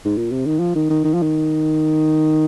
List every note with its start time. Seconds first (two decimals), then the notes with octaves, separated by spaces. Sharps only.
0.05 G#2
0.18 A#2
0.31 C3
0.46 D#3
0.59 F3
0.75 D#3
0.90 D#3
1.04 D#3
1.14 F3
1.22 D#3